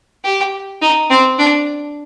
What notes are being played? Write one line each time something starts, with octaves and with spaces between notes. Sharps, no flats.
G4
D#4
C4
D4